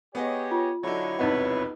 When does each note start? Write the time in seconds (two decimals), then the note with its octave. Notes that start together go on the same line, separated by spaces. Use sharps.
0.15 B3 G4 G#4 C#5 D#5
0.51 F4
0.83 D3 F#3 D#4 E4 C#5 C#6
1.19 E1 C2 F2 D#4 B4 D#5 F#5